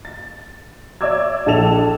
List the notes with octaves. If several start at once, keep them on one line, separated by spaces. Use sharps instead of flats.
A6
C#5 D5 E5 D6 E6 G#6
A#1 E4 A4 E7 F7